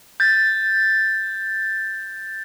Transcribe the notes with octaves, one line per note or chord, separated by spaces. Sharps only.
G6 A6